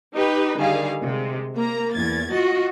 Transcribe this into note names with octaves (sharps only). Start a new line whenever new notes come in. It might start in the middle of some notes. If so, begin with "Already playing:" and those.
D#4 G4 B4
D3 D#3 G3 G#4 F5
C3 G#3
A#3 A#5
E2 G#6 A6
F4 F#4 D#5